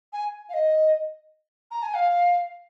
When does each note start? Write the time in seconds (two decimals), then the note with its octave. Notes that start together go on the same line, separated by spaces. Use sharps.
0.12 G#5
0.49 F5
0.53 D#5
1.71 A#5
1.82 G#5
1.94 F5